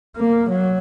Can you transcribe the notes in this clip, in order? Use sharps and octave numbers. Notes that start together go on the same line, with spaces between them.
A#3
F#3